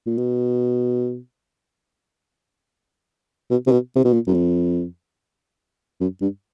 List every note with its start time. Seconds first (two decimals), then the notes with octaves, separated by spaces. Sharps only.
0.07 A#2
0.18 B2
3.50 B2
3.67 C3
3.72 B2
3.96 C3
4.04 B2
4.13 A#2
4.27 F#2
4.34 F2
6.01 F#2
6.21 G2